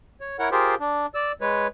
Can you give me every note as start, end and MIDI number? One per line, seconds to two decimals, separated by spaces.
0.21 0.37 73
0.39 0.49 64
0.39 0.49 70
0.39 0.49 73
0.39 0.49 78
0.52 0.75 65
0.52 0.75 67
0.52 0.75 68
0.52 0.75 70
0.52 0.75 72
0.80 1.06 62
1.15 1.32 74
1.15 1.32 88
1.41 1.67 56
1.41 1.67 71
1.41 1.67 73